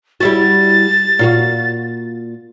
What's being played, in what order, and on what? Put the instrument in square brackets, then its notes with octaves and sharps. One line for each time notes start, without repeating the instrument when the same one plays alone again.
[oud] G3 E4 F#4 [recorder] A6
[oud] A#2 F4 F#4